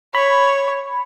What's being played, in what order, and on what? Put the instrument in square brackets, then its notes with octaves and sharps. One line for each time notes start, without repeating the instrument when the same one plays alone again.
[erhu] C#5 [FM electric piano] B5